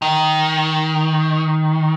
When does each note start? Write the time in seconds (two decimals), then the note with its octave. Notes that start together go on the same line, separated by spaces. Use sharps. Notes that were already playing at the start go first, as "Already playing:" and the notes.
0.02 D#3